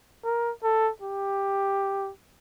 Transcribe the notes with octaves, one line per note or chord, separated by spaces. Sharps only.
A#4
A4
G4